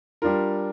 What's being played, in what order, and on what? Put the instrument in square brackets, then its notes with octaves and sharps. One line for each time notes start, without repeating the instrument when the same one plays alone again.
[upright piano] G3 D4 F4 A#4